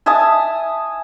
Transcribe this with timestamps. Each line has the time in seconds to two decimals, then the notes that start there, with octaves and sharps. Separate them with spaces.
0.06 E5 G#5 A5 D#6